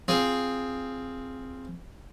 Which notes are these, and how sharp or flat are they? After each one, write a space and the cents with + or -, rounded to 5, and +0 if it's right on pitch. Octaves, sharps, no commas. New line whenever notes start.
C4 +0 F4 +0 G#4 +0